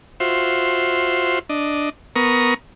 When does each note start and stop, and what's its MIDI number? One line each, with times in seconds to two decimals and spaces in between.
0.20 1.39 65
0.20 1.39 66
0.20 1.39 72
0.20 1.39 76
0.20 1.39 84
1.49 1.89 62
1.49 1.89 75
2.16 2.54 59
2.16 2.54 70
2.16 2.54 82
2.16 2.54 85
2.16 2.54 87